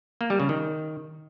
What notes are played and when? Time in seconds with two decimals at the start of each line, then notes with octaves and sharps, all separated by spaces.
0.21 A#3
0.30 G3
0.40 C#3
0.49 D#3